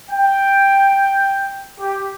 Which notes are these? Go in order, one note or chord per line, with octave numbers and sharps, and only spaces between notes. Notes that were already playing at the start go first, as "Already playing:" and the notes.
G5
G4